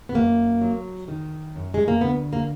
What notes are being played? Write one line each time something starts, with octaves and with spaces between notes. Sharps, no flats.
B3
F#2 A#3
F#3
D#3
F#2
G#3
A#3
D2 B3
A#3